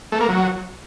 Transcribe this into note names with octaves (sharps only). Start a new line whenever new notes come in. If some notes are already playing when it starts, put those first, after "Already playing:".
A3
A#3
F#3